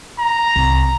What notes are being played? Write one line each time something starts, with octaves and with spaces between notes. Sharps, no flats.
A#5
C2